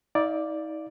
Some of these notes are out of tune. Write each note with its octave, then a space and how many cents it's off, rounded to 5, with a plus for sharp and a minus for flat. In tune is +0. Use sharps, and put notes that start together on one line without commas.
D#4 +40 D5 +0 F5 +0